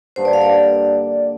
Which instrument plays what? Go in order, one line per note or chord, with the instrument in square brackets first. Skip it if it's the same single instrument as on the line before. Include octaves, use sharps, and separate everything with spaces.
[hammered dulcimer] G2 D3 A#3 D4 [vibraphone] C5
[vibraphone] D5
F5
D5